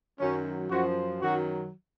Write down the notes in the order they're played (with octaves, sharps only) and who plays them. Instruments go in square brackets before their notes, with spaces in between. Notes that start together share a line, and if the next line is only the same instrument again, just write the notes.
[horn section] F#2 D#3 F#3 C#4
F#2 F3 F#4
F#2 D#3 F#3 F#4